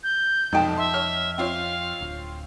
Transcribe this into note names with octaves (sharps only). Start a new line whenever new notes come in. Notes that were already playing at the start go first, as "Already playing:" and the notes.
G6
F1 B1 F2 D#4 G5 A5
E5 C6
C#5 F6
C4 F4 C#5 F5
D1